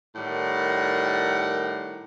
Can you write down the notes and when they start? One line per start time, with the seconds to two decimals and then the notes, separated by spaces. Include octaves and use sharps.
0.15 A2 D#3 G3 A#4 F#5